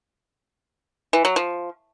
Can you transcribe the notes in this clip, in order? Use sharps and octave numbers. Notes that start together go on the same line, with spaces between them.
E3
F#3
F3